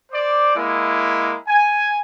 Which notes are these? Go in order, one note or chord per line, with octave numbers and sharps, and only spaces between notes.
C5 D5 D6
G#3 A#3 E4
G#5